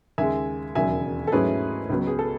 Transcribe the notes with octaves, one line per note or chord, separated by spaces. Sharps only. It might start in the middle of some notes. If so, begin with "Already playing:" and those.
D#2 C#3 G#3 E5 G#5
E1 D#2 C#3 F#3 E5 G#5
A4
G#2 F#3 A3 C#4 E4 G#4 B4
C#2 C#3 F#3 B3
G#4
A4